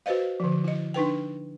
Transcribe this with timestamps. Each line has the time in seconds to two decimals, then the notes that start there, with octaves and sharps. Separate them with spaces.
0.06 F#4 B4 C5 D#5 F5
0.40 D3 F3
0.64 E4 D#5
0.94 D4 D#4 B4 G5